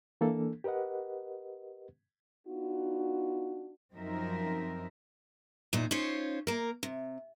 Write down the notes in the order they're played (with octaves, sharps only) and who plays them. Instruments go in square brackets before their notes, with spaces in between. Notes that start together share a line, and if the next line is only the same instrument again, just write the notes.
[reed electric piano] E3 A#3 D4 A4
G4 A#4 B4 D#5 F#5
[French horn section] B3 D4 D#4 F4 F#4
[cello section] F#2 F3 C4 D#4 A#4 E5
[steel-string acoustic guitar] E2 A#2 D#4
C#4 D#4 F4 C5 C#5
A#3 A#4
C3